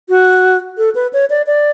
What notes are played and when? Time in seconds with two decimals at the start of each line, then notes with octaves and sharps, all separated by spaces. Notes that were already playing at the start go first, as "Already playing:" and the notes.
0.09 F#4
0.78 A4
0.95 B4
1.13 C#5
1.30 D5
1.47 D5